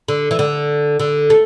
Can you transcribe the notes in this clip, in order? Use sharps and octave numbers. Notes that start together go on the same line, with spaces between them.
D3
E3
D3
D3
A3